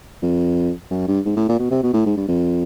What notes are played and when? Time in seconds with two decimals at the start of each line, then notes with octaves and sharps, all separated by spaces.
0.23 F2
0.91 F#2
1.08 G2
1.26 G#2
1.36 A2
1.49 A#2
1.59 B2
1.71 C3
1.83 B2
1.94 A2
2.06 G#2
2.17 G2
2.28 F2